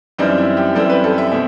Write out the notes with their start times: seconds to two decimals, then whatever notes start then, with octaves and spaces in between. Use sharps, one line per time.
0.18 F#2 E3 G3 C4 D#4
0.38 E4
0.57 G4
0.75 F#2 E3 G3 C4 A4
0.90 B4
1.04 A4
1.18 E5
1.32 B2 A3 C4